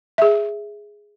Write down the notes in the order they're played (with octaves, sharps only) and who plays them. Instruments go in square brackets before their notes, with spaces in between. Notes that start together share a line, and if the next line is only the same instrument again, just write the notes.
[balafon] G#4 E5